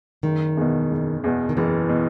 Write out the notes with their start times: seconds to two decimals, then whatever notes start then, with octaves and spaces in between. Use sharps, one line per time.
0.23 F#1 D#3
0.57 E2 B2
0.91 F#1
1.24 E2 B2
1.49 D#3
1.57 F#1 E3
1.90 B2